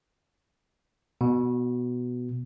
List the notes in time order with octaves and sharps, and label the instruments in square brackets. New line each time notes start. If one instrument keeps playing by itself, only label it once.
[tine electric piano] B2